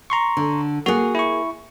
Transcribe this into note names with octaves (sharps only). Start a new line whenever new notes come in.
A#5 C6 C#6
D3
A#3 F#4 G#4 F#5
E4 C#6